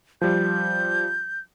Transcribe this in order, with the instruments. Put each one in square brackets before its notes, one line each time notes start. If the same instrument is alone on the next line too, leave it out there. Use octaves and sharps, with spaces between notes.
[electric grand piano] F3 G3 [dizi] G6